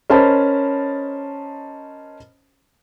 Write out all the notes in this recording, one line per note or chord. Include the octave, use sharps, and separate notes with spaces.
C#4 A#4 C5 D#5 A5 B5